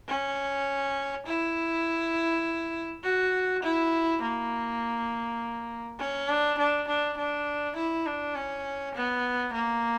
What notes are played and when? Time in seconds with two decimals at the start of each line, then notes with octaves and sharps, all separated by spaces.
0.08 C#4
1.27 E4
3.03 F#4
3.63 E4
4.22 A#3
5.99 C#4
6.29 D4
6.59 D4
6.88 D4
7.17 D4
7.76 E4
8.06 D4
8.35 C#4
8.95 B3
9.54 A#3